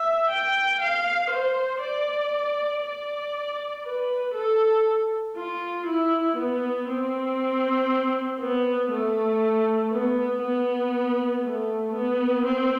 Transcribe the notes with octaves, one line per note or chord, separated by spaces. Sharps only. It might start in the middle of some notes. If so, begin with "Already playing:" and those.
Already playing: E5
G5
F5
C5
D5
D5
B4
A4
F4
E4
B3
C4
B3
A3
B3
B3
A3
B3
C4